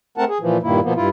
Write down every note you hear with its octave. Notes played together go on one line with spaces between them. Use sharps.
A3 C4 A#4 F#5 A5
G#4
A#2 E3 F3
G2 A#2 D#3 A#3 E4
B2 F3 A#3 B3
G2 E4 F4